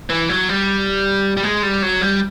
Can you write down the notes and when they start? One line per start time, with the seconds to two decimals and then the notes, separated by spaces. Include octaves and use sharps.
0.10 E3
0.29 F#3
0.49 G3
1.37 G3
1.43 G#3
1.63 G3
1.83 F#3
2.02 G3